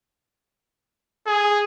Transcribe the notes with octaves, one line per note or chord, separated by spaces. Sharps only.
G#4